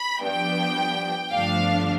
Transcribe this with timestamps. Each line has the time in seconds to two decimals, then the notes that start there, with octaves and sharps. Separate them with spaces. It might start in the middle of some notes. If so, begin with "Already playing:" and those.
Already playing: B5
0.20 G2 F3 B3 D4 G5
1.31 G1 G2 F3 A3 D4 F5